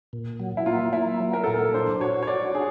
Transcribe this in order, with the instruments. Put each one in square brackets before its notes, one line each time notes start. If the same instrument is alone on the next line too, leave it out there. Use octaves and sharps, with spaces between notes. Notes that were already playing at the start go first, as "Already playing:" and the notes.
[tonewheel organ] A#2
F#3
[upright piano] E4
[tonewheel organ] A#3 [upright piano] F4
[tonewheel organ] A#3 [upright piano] E4
[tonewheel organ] F#3
[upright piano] A#4
[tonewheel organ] A#2 [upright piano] A4
[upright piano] A#4
[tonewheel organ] D4 [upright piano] C5
[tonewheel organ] F#4 [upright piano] C#5
[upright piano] C#5
[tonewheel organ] F#4 [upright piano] D5
[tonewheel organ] D4 [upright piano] G#4